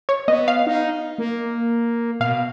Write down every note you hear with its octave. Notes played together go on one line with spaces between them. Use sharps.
C#5
B3 D#5
F5
D#4
A#3
B2 F5